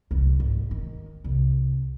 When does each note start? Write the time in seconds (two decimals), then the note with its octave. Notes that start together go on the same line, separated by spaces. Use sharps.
0.11 C2 F#3
0.40 G#1
0.71 D#3
1.24 C2